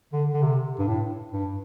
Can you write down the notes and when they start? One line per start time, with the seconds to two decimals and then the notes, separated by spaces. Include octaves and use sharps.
0.13 D3
0.34 D3
0.42 C3
0.79 G2
0.87 A2
1.32 G2